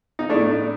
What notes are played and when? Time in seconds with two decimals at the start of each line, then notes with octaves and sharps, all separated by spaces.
0.19 D#4
0.30 A2 A3 D4